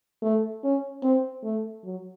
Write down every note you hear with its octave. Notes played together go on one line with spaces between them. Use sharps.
A3
C#4
C4
A3
F#3